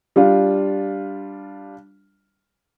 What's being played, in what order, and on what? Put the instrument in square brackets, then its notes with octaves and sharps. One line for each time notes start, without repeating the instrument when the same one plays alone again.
[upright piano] G3 D4 F4